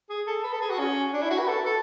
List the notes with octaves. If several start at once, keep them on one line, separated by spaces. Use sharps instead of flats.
G#4
A4
B4
A4
G#4
F#4
C#4
D4
E4
F#4
B4
A4
A4